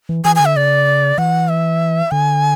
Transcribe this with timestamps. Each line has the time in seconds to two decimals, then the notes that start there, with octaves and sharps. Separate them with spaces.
0.09 E3
0.25 E3 G#5
0.36 D3 G#5
0.46 E5
0.56 C#3 D5
1.18 E3 F#5
1.49 E5
2.11 D3 G#5